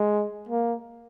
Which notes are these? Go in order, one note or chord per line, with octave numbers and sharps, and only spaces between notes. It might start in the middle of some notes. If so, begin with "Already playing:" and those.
Already playing: G#3
A#3